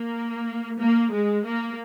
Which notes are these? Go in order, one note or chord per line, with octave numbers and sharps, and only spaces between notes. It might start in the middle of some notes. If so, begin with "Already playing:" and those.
Already playing: A#3
A#3
G#3
A#3